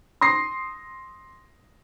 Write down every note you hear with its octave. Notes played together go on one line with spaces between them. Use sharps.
C6 D#6 A#6 C7